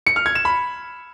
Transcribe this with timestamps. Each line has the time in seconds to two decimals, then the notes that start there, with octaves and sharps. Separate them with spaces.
0.07 C#7
0.16 F6
0.26 G#6
0.35 E7
0.45 B5